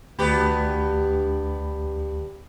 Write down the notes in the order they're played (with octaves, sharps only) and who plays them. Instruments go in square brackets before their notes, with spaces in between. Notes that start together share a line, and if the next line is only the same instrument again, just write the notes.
[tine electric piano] D2 B5 [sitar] G2 B3 G4